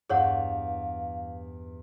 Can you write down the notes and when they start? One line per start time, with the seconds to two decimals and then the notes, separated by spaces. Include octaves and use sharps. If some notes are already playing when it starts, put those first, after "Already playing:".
0.10 E2 G2 G#4 C#5 F5 F#5